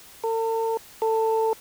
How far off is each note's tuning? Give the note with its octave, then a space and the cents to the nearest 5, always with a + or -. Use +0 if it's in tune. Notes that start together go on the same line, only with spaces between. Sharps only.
A4 +45
A4 +20